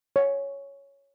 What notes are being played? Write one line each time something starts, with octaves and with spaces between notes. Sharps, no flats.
C#5